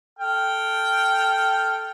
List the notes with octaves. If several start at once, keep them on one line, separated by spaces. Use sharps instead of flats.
A4 G5 F6